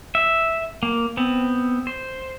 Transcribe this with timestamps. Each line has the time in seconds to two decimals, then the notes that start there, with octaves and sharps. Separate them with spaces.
0.15 E5
0.83 A#3
1.17 B3 C4
1.87 C5